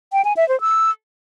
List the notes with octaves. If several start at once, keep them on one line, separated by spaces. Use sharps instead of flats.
G5
G#5
E5
C5
E6